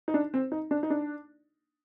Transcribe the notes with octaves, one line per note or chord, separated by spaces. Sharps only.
D#4
D4
C4
D#4
D4
D#4
D4